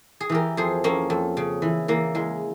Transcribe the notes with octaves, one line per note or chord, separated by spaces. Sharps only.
G#4
E3 G4 A#4
F2 G#4 C5
F2 A#3 C#4
F2
C#3
E3
E3 A#3
E2 G#3